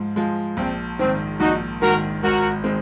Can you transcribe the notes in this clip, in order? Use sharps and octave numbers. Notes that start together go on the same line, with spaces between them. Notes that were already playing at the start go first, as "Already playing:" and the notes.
Already playing: G#2 F3 G#3
F3 G#3
A#1 C4
G#2 D#3 C4
A#1 D#4 F#4
G#2 D#3 F#4 A#4
G#1 F#4 A#4
D#3 G#3 C4